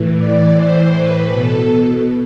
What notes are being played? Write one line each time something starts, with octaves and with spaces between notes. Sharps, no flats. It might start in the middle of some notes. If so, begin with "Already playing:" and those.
Already playing: A2 E3
D5
A2 E3 C5
B4
B2 A4